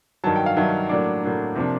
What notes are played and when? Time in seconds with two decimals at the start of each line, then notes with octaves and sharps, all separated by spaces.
0.24 G2 D#3 F#3 A5
0.36 G5
0.46 F5
0.56 G2 D#3 F#3 E5
0.89 A2 F#3 A#3 D4 D5
1.23 A2 F#3 A#3 D4
1.55 C3 F3 A#3 D4